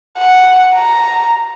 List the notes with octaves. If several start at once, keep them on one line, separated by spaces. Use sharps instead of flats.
F#5
A#5